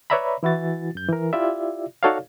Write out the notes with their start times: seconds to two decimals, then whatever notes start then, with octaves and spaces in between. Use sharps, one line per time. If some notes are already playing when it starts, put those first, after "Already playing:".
0.10 B4 C#5 D5 E5 A#5 B5
0.43 E3 E4 F#4 A6
0.95 F#2 G6
1.09 E3 A#4
1.33 E4 F4 G4 D5 E5
2.03 D#4 F#4 A4 C#5 D5 F5